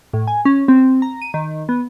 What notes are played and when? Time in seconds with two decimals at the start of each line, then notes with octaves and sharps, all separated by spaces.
0.13 A2
0.27 G#5
0.45 C#4
0.68 C4
1.02 A#5
1.22 D#7
1.34 D#3
1.69 B3